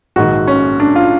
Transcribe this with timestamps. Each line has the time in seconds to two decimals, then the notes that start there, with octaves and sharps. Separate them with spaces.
0.16 A#1 G#2 D#3 F#4
0.47 C#4
0.80 D4
0.96 F4